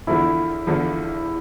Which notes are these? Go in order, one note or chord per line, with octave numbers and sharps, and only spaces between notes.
E2 D3 F3 E4
E2 D3 F3